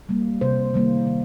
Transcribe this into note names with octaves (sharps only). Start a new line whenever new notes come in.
G3 A#3
C3 C5
D#3 G3 A#3
D#3